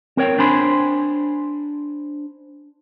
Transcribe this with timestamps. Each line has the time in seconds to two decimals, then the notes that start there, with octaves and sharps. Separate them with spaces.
0.17 C4 A#4 C#5 G5
0.38 D4 C5 G#5 B5 C6